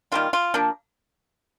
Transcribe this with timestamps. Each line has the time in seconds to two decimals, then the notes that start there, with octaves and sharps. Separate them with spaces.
0.12 D#3 G3 A#3 F4
0.33 F4
0.54 F3 A#3 D4